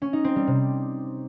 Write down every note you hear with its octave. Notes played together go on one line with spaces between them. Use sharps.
C#4
D#4
C4
G3
C3